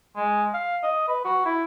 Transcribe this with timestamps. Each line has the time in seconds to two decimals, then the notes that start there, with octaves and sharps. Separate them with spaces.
0.16 G#3
0.54 F5
0.83 D#5
1.08 B4
1.24 F#4
1.45 E4